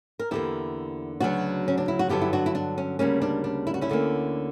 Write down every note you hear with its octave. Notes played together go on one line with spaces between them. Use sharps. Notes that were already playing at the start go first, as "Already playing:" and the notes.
A#4
E2 D3 A#3 E4 G4
D2 C#3 F#3 B3 D4 F#4
C#4
D4
E4
F#4
G2 D3 F#3 B3 E4 G4
E4
D4 F#4
E4
D4
C#4
D2 C#3 G3 A#3 C#4
D4
D4
E4
F#4
C#4 E4
D2 D3 A#3